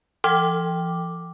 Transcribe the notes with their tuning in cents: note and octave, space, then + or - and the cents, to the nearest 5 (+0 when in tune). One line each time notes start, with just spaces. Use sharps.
F3 -45 F#5 +0 D6 +0